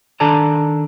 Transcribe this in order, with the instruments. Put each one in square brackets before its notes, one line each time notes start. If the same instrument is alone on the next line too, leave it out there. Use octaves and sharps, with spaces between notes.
[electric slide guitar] D#3 D4 A4 D5 A5 A#5